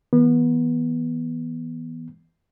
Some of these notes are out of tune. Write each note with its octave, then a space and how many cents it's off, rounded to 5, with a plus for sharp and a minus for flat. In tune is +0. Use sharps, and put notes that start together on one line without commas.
E3 -20 B3 -25